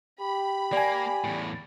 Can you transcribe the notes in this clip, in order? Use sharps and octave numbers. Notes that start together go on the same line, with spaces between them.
G4 B5
A#3 D5 G#5
E2 A2